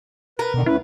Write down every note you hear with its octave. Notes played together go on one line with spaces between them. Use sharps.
A#4 B4
B2 D3 D#3
D2 C#4 E4 B4